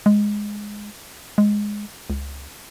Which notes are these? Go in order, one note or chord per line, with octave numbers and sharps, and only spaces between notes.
G#3
G#3
C#2